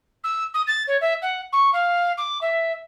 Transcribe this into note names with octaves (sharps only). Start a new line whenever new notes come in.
E6
D#6
A6
C#5
E5
F#5
C#6
F5
D6
E5